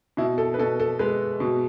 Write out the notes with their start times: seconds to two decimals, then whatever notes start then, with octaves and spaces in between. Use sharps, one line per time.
0.17 B2 E4
0.38 A4
0.54 B4
0.59 B2 A4
0.80 A4
0.99 G#3 B4
1.40 B2